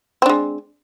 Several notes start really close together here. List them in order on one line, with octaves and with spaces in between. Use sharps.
C4 D4 G#3